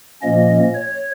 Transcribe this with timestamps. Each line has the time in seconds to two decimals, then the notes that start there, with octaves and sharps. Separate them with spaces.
0.22 A#2 F3 A#3 C#4 D#5
0.74 C#5